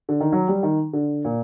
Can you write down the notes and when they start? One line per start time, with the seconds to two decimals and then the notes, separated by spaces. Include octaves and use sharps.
0.09 D3
0.20 D#3
0.32 F#3
0.48 G3
0.63 D#3
0.93 D3
1.25 A#2